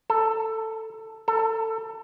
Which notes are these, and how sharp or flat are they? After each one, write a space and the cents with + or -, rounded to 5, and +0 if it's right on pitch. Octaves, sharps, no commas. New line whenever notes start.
A4 +10
A4 +20